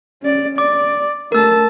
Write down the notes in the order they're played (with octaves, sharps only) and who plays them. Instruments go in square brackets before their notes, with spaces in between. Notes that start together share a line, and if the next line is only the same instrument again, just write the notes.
[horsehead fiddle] C#4 D5
[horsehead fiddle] D5 [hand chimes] D6
[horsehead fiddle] A3 A5 [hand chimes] A#4 E6